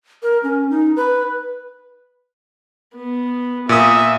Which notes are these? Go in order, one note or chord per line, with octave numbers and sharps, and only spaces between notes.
A#4
C#4
D#4
B4
B3
A#2 E5 D#6